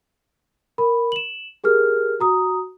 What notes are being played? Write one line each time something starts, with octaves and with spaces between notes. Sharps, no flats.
A#4 B5
E7 F#7
G4 G#4 A#4 F6
F#4 A#5 D#6